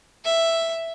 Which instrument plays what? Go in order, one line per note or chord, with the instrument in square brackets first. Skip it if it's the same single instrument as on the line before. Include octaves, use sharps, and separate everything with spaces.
[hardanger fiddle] E5